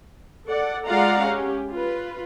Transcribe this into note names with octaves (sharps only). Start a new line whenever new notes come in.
A4 D5 F#5
G#3 F4 D5 F5 F#5 A#5
C#4 G4
F4 B4